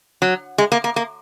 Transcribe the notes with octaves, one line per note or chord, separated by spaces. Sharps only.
F#3
G#3
A#3
A#3
A#3